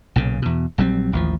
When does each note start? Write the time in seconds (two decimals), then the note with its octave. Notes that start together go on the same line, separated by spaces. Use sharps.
0.16 B1 A#2 C#3
0.42 E2 B2
0.78 A#1 F#3 G3 C4
1.13 A1 D#2 F3